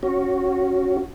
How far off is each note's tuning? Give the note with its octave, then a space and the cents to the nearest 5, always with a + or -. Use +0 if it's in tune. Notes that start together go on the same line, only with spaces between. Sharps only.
C#4 +0 F#4 +0